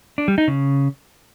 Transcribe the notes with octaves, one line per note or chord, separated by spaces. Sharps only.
D4
G3
D#4
C#3